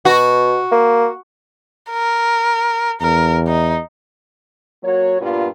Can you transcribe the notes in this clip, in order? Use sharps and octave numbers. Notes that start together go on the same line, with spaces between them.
B2 F#4
A#3
A#4
E2 A#4
D#4
F#3 A#3 F#4 C#5
G2 A#2 G3 B3 F4